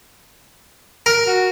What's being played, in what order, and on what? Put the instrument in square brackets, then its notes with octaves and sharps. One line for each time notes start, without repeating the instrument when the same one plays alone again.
[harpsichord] A#4
[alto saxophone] F#4